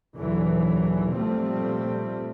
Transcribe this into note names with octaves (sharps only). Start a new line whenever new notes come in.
A#1 D#2 D3 E3 F#3
A#2 F3 G3 A3 C4